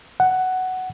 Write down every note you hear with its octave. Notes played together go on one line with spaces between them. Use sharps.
F#5